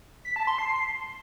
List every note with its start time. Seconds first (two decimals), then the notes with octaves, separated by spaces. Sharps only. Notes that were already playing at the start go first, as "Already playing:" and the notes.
0.25 B6
0.36 A5
0.47 C6
0.58 C7